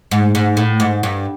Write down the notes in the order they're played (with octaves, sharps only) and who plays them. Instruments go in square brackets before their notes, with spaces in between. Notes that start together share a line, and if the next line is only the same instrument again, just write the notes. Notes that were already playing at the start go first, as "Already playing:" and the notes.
[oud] G#2
G#2
A2
G#2
G2